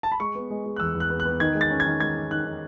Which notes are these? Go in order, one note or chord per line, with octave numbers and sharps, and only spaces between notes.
A5
B5
G#3 C#6
B3
G#3
G#3
F#6
E2 E6
E2
F#6
B3
F#6
B3
D#3 G#6
G#3
A6
C#4
G#6
D#3
G#3 G#6
D#3
D#3 F#6
D#3